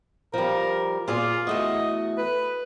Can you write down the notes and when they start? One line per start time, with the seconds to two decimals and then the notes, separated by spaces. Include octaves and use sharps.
0.34 F3 G3 A#4
1.08 A#2 F4 G#4 D5
1.47 E2 A3 F#4 D#5
2.18 B4